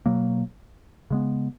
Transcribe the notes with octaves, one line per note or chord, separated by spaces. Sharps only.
B2 F#3 A#3
C#3 G#3 B3